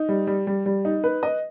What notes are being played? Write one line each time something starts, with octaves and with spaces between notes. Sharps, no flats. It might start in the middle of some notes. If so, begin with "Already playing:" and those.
Already playing: D#4
G3
G3
G3
G3
D#4
B4
D#5